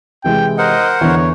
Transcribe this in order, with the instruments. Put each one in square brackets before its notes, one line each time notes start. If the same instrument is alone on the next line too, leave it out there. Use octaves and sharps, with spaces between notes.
[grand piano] C3 E3 G#3 [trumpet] G5
[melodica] A#4 C5 F#5 [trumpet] D#5
[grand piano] E2 D3 [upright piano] E3 [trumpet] C#5